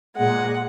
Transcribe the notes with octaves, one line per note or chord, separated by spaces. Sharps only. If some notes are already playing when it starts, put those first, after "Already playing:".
A#2 G#3 F#5